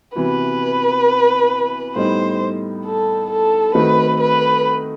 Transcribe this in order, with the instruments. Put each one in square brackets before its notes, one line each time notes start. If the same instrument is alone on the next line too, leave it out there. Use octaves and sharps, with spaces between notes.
[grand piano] C3 E3 B3 F#4 [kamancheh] B4
[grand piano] A2 G3 B3 D#4 [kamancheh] C5
[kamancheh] A4
A4
[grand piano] D#3 A3 C4 D#4 F#4 [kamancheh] B4
[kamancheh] B4